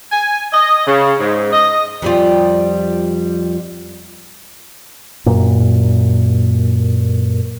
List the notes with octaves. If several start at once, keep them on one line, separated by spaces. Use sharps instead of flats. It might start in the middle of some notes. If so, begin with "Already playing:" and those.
G#5
D#5
C#3
G#2
D#5
F2 G3 F4
F#2 A#2